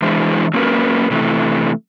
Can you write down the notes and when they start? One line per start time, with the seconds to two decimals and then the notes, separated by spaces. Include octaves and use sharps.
0.02 E3 G#3 D4 E4 G#4 C5
0.54 F#3 A#3 C#4 A#4 B4
1.11 C3 E3 A3